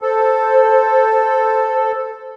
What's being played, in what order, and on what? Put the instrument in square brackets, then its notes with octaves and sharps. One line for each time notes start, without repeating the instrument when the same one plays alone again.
[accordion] A4 [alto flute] C5